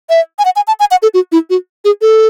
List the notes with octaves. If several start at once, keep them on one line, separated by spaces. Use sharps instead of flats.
E5
G#5
F#5
G#5
A5
G#5
F#5
A4
F#4
E4
F#4
G#4
A4